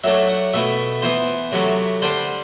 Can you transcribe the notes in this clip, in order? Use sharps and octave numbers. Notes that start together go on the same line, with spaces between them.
F#3 A3 D4 E5
F#5
B2 A3 E4 E5
E3 B3 E4 C5
C3 F#3 A3 E4
D3 G3 D4 C5